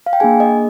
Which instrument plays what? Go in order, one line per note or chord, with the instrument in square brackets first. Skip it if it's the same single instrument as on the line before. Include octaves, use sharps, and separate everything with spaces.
[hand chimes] F5
G5
A#3 D4 G#4 G#5
D#5